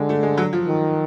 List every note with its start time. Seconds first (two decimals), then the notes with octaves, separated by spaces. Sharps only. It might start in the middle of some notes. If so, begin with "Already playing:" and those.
Already playing: D3 G#3
0.09 A3
0.23 G#3
0.37 F#3
0.53 F3
0.67 D#3